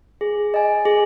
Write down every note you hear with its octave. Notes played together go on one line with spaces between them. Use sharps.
G#4
D#5 G#5
G#4